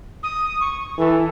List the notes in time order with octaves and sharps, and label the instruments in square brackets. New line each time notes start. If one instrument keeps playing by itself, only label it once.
[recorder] D#6
C#6
[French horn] E3 [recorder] A4